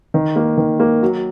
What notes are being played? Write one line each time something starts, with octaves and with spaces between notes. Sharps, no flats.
D#3
A#3
D#3
A#3
F#3